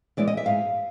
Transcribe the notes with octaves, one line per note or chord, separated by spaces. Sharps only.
E3 G#3 B3 E4 D5
D#5
E5
G#2 F5